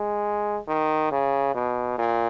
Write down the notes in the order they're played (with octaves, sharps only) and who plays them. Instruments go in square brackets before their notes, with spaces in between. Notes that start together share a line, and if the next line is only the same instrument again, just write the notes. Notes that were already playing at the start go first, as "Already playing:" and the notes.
Already playing: [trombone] G#3
D#3
C#3
B2
A#2